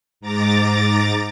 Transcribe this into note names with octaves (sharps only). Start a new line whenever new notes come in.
G#2 A#5 D6 A6